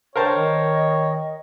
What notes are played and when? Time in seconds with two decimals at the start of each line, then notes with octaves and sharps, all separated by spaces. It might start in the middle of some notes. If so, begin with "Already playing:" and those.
0.16 A#4 C5 C#5 G5 A5
0.35 D#3 D#5